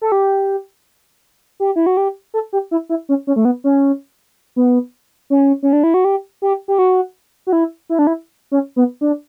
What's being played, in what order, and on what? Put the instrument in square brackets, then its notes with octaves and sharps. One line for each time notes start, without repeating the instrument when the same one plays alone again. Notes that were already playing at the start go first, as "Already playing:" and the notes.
[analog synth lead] A4
G4
G4
E4
F#4
G4
A4
G4
E4
E4
C#4
C#4
A3
B3
C#4
B3
C#4
C#4
D4
E4
F#4
G4
G4
G4
F#4
F#4
E4
E4
D4
E4
C#4
B3
D4